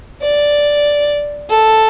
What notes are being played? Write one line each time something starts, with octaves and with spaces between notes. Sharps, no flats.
D5
A4